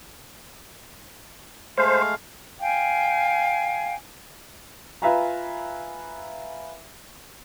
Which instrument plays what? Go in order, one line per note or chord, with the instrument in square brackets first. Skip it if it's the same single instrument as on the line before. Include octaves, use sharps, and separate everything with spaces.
[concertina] G#3 A3 F5 [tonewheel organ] C5
[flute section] F5 G5 G#5
[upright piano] F4 B4 E5 F5 G#5 A#5